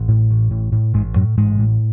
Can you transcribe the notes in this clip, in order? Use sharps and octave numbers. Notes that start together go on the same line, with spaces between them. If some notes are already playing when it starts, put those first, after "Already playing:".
Already playing: A1
A2
A1
A2
A2
A1 G#2 G#3
F#2 A2 F#3
A1 G#2 G#3
A2